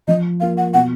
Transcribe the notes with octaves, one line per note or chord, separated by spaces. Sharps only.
F3 D#5
A#3 F4 F5
F#5
B2 F#5